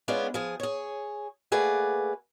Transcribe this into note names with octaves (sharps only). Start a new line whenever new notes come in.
G#3 B3 C#4 D4 F4
F3 G#4
G#4 C#5
A3 A#3 G#4 B4 D5 F#5